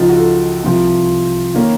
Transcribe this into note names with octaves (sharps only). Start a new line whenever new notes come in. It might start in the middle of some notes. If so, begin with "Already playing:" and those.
Already playing: C#2 C#3 F3 D#4 F4
F#4
A4
C2 C3 F3
D#3 A#3 C#4